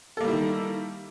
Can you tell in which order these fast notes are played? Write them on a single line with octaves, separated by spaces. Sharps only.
A4 A#3 G3 E4 D#3